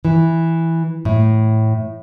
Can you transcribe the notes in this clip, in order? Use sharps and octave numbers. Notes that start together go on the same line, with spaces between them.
E3
A2